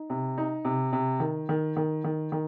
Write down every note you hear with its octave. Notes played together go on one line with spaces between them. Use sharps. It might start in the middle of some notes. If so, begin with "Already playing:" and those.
Already playing: D#4
C3
D#4
C3
C3
D#3
D#3
D#3
D#3
D#3